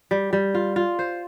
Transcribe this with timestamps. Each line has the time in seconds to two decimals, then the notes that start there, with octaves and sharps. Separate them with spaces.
0.11 G3
0.33 G3
0.54 F4
0.76 F4
0.99 C5